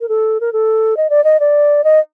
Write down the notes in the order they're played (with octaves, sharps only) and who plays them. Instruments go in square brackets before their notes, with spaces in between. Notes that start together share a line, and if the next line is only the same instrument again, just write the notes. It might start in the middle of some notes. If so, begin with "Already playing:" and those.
[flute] A#4
A4
A#4
A4
D#5
D5
D#5
D5
D#5